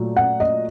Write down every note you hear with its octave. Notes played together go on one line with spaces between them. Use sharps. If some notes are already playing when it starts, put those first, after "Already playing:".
Already playing: A#2 F#3 A3
F#5
D#5